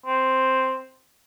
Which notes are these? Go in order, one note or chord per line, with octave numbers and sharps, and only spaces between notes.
C4